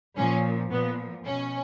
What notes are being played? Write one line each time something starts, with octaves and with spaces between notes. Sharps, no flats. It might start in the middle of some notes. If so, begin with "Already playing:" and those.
A#2 F3 C#4
A#2 F3 B3
B2 C#4